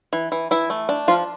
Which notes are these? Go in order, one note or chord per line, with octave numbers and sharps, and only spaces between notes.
E3
E3
E3 E4
A3
D4
F3 F4